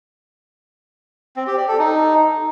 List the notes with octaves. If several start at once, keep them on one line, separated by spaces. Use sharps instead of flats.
C4
G4
D5
A4
D#4